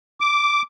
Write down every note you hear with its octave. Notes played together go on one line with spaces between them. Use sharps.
D6